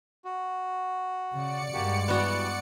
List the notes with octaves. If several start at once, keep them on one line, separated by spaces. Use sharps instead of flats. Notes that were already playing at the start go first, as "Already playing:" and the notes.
F#4
C#3 D5 C#7
G2 G#3 A#3 F#4 G4
E3 G3 B3 F#4